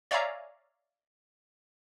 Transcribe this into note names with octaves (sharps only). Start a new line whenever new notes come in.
C#5 D5 E5 F5 G#5 A#5